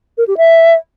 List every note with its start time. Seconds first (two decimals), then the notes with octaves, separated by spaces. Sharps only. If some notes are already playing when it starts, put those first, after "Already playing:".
0.18 A#4
0.28 G4
0.37 E5